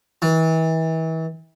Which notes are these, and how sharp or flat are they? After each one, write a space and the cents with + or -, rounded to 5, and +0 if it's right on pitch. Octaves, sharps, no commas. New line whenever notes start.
E3 -35